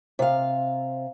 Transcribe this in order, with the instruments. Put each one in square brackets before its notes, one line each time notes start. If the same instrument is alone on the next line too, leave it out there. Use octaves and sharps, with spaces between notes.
[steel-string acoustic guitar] C3 F5